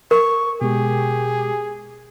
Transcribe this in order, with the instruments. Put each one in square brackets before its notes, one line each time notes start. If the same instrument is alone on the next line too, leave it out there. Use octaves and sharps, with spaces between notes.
[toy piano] A#4 [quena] C#6
[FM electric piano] B2 G#3 [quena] G4 [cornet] G#4